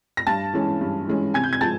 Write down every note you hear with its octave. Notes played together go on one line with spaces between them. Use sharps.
A#6
G2 A5 A6
E3 G#3 C#4
G2
E3 G#3 C#4
C3 G#5 G#6
G6
G#6
F3 G#3 A5 A6